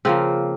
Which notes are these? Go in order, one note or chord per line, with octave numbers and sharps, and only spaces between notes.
C#3 F3 A#3 C4